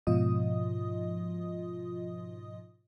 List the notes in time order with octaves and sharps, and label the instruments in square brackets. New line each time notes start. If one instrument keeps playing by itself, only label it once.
[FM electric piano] G#2 B2 F3 F4 D#5 D#6